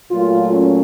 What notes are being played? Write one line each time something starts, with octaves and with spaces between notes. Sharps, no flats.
A#2 F#3 A3 F4
C#4